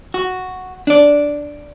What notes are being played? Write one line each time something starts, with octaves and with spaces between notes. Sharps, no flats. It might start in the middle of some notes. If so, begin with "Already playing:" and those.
F#4
D4 D5